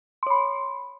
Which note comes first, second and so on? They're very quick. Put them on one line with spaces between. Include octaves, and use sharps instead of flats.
C6 C#5 B5